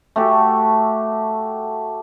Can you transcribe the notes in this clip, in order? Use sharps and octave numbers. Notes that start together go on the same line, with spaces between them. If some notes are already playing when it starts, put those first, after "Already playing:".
A3 F#4 G4 A4